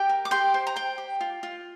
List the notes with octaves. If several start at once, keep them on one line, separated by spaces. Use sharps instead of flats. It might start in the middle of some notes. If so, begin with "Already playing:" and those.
Already playing: G4 G5
A#4
D6
G4 G5 C6
C5
A#5
C5 G5
G4
F4
F4